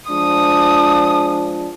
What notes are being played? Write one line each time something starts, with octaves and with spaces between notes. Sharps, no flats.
F3 G#3 D4 D#6